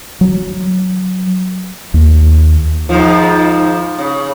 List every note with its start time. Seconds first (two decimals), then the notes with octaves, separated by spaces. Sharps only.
0.21 F#3
1.94 D#2
2.89 G#2 D#3 F3
3.99 C#3